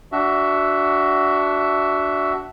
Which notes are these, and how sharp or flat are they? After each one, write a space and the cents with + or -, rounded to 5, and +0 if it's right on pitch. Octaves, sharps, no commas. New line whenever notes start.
D4 -10 F#4 +15 E5 +0